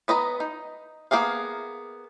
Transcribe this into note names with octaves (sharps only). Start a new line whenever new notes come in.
B3 B4 D#5 A#5
D#4
A#3 B3 G#4 F5